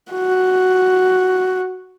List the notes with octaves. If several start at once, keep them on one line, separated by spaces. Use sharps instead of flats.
F#4